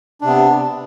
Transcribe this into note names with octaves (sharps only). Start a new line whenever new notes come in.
C3 B3 D4